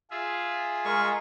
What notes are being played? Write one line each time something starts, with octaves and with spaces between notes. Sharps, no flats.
F4 G#4 E5
G#3 A#4 C#6